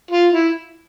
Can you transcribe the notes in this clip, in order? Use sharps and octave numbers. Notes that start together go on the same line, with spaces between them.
F4
E4